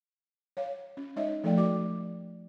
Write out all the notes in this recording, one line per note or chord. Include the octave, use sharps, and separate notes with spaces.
C#5 F5
C#4
G#3 D#4 C#5 D#5 E5
F3 A3 A4 D5 F5 G5
F#4 D5 D6